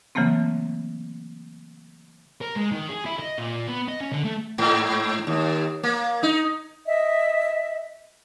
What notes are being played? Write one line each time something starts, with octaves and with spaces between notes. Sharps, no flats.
C#3 E3 F#3 A3 A#3 C4
A#4
G#3
D#3
G#4
E4
D#5
A#2
B3
D#5
C#4
D3
A3
G#2
D#2
A#3
D#4
D#5 E5